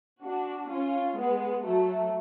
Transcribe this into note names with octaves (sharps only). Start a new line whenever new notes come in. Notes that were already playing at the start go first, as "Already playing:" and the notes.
D4 F#4
C#4 F4
G#3 B3
F#3 A3